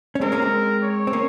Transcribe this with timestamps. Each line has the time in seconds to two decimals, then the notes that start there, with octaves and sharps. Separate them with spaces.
0.15 C#4
0.21 G#3 C4 A#4
0.32 A#3 C#4
0.42 G#3 C4
0.83 C#5
1.07 C4
1.13 A#3 C#4